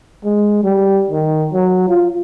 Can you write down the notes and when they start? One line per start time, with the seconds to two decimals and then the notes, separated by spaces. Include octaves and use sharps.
0.25 G#3
0.63 G3
1.10 D#3
1.53 F#3
1.88 F4